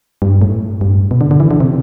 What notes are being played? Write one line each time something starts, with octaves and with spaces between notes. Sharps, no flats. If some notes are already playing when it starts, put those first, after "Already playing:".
G2
A2
G2
B2
D3
D3
E3
D3
C3